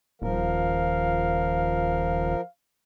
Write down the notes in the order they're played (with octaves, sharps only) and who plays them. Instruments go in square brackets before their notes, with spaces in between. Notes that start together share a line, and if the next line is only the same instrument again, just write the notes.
[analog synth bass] D#1 [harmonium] F3 A#4 [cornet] F5